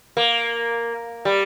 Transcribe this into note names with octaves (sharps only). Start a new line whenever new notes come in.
A#3
G3